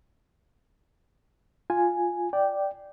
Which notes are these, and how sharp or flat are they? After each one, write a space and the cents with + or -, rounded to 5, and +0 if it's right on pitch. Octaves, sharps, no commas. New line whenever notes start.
F4 +5 G#5 +0
D5 +0 G5 -10